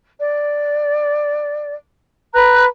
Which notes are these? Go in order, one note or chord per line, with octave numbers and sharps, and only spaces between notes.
D5
B4 A#5 F#6